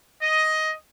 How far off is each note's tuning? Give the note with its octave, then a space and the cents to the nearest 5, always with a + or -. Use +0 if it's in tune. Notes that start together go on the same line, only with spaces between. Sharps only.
D#5 +10